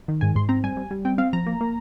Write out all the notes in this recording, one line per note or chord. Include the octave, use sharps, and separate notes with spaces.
D#3
G#2 G#5
G#2 C6
C4 A#5
G3 G#5
G3
G3
C4 G5
C4 F5
F3 A#5
A#3
A#3